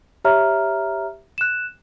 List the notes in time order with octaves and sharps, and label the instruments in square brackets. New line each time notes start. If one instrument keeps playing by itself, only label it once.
[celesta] G4 C#5 E5 A#5 F6
F#6 E7